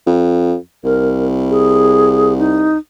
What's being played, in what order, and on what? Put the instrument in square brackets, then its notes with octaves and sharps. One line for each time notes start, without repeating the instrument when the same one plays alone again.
[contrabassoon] F2
[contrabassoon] C2 [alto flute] A#4
[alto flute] G#4
D#4